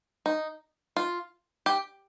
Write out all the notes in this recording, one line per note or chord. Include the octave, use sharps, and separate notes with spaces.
D#4
F4
G4